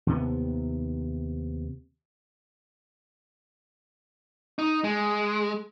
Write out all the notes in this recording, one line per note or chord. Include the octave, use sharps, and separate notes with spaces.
D#2 C3 B3
D#4
G#3